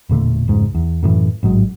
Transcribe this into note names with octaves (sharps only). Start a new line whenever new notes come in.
E1 A#2 D3 A3
F1 C#2 G#2
E2
F#2 A2 D#3 E3
A1 G#2 F#3 G#3